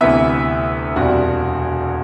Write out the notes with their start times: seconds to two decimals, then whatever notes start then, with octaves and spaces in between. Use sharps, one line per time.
0.01 D2 C3 E3 B3 E5
0.96 E1 E2 C3 G3 F#4